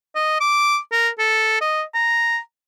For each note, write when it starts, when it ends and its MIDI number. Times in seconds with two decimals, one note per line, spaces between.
0.15 0.36 75
0.40 0.78 86
0.92 1.09 70
1.19 1.57 69
1.61 1.82 75
1.94 2.38 82